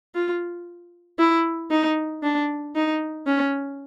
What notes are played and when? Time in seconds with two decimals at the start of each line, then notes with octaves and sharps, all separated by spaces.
0.15 F4
1.19 E4
1.70 D#4
2.23 D4
2.75 D#4
3.27 C#4